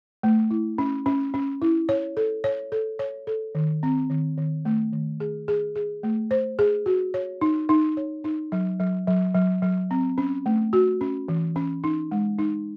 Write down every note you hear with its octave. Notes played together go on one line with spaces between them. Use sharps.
A3
E4
C#4
C#4
C#4
E4
C#5
A4
C#5
A4
C#5
A4
D#3
C4
D#3
D#3
A3
D#3
G#4
G#4
G#4
A3
C5
G#4
F#4
C#5
D#4
D#4
C#5
D#4
F#3
F#3
F#3
F#3
F#3
C4
C#4
A3
F#4
C#4
E3
C#4
D#4
G#3
D#4